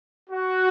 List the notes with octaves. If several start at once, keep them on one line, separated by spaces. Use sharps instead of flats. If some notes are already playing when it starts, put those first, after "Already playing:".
F#4